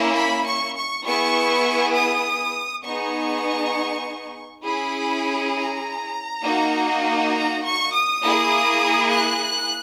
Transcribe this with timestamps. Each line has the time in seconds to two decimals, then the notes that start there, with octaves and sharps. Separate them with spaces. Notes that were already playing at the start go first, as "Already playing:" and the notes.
Already playing: A#3 C#4 E4
0.15 B5
0.45 C#6
0.76 C#6
1.05 B3 E4 G#4 C#6
1.95 D#6
2.84 B3 D#4 G#4 C#6
4.64 C#4 E4 G#4 B5
5.55 A#5
6.43 A#3 D#4 F#4
7.34 A#5
7.63 C#6
7.93 D#6
8.23 A#3 E4 G#4
9.12 F#6